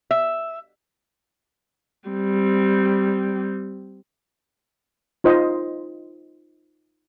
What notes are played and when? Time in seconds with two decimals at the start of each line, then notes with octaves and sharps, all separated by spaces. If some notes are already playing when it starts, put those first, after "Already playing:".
0.11 E5
2.09 G3 C4
5.24 D#4 F4 C5 D#5